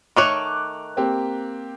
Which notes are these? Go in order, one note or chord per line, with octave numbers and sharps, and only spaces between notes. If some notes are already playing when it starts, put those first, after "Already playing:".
D#3 A3 C#5 D6 F#6 F7
A#3 C4 G4